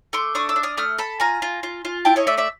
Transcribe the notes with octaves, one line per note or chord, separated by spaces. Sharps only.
A3 C6 D6
D4 C#6 D#6
D6 E6
D4
D#6 F6
A3 D#6 F6
A4 A5 B5
F4 G#5 A#5
F4
F4
F4
E4 G5 A5
C#5 D#5
A3 D5 E5
D5 E5